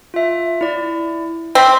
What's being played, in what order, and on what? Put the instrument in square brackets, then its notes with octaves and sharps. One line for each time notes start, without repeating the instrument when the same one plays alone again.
[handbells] F4 E5
E4 D5
[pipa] C4 [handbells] C6 B6